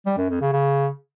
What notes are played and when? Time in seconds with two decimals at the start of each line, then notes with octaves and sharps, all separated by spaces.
0.06 G3
0.18 F#2
0.30 F2
0.41 C#3
0.53 C#3